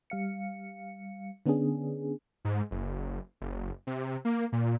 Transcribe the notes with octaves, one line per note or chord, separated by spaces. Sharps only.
G3 F5 C#7
D3 B3 C#4 D4 G#4
G#2
F#1
F#1
C3
A#3
A#2